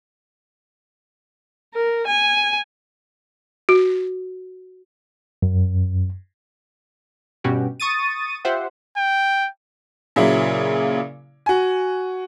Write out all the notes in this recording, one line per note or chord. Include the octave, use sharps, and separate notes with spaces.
A#4
G#5
F#4
F#2
G2 B2 C#4 F#4 G4
C#6 D#6 A6 D#7
F4 G4 C5 E5 F#5
G5
A#2 C#3 F#3 A#3 E4
F#4 G#5